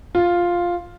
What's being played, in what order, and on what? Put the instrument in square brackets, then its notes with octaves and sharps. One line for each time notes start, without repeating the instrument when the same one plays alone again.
[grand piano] F4